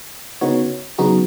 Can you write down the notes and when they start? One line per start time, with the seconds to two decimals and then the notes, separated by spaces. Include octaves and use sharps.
0.41 C#3 B3 D#4 F#4 C#5
0.98 C#3 F#3 B3 D#4 F#4